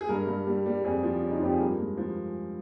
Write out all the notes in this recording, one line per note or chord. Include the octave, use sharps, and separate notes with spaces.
G#4
G2 A#4
G2
G3
G3
F2 G#4
F3
C#3
D#4
F4
F2 G4
G#4
G2 A#4
G#3
F3